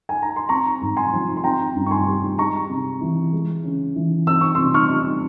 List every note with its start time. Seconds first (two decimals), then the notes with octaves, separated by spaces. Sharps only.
0.09 G#5
0.22 A#5
0.36 C6
0.49 C4 A#5 C#6
0.81 G#2
0.97 G#5 C6
1.13 F3
1.37 C6
1.44 C4 G5 A#5
1.75 G2
1.86 C#6
1.91 G#5 C6
2.07 G3
2.38 G#3 A#5 C#6
2.69 C3
3.01 E3
3.33 G#3
3.64 C#3
3.96 E3
4.27 C4 E6
4.41 C#6
4.55 C3 C6 E6
4.74 C#6 F6
4.90 G3